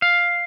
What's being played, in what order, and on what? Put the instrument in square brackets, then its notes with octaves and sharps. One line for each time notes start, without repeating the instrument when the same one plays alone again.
[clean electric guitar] F5